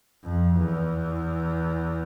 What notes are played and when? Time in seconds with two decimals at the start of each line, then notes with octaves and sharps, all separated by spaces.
0.24 F2
0.57 E2